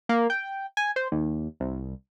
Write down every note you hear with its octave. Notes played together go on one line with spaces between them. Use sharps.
A#3
G5
G#5
C5
D#2
C2